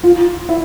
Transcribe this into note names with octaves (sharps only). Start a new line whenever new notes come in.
F4
E4